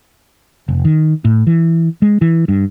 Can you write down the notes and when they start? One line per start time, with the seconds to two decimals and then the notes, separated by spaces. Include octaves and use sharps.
0.68 F1
0.85 D#3
1.25 A2
1.47 E3
2.02 G#3
2.21 E3
2.48 G2